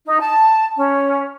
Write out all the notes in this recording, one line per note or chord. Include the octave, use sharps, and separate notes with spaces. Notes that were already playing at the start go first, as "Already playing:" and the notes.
D#4
A5
C#4